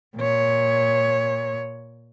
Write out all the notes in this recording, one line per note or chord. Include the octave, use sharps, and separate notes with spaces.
A#2 C#5